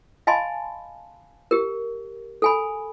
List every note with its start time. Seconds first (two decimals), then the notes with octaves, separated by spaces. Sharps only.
0.27 D#5 F5 G#5 A5 B5 C6
1.51 G4 A#4
2.42 A4 G#5 B5